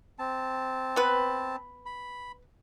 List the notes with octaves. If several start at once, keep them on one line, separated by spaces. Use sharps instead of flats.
C4 A5
B3 B4
B5